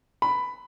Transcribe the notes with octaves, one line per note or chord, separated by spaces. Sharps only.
B5